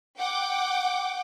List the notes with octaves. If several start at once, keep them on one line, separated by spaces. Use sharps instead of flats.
F#5 G5 D6